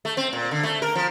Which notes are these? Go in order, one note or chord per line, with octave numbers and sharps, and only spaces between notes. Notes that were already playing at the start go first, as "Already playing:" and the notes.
A3
C4
A#2
D3
A3
A#4
F3